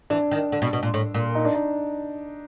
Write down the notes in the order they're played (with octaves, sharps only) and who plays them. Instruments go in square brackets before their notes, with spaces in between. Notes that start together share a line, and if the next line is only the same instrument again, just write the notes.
[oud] E3 [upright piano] D4
[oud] D#3
D3
B2
B2
A#2
A2
A#2
[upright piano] D#4
D4
D#4